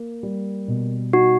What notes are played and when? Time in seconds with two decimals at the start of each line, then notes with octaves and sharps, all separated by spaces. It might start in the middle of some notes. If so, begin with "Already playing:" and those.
Already playing: A#3
0.23 G3
0.68 B2
1.13 D#4 F#4